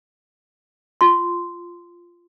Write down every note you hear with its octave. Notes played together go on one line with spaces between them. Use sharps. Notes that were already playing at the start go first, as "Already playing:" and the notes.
F4 C6